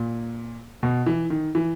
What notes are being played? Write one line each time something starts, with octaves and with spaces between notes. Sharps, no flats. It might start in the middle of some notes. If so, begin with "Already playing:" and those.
Already playing: A#2
B2
E3
D#3
E3